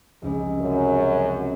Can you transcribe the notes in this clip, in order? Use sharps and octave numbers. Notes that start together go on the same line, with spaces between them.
F1 C#2 G#3
F#2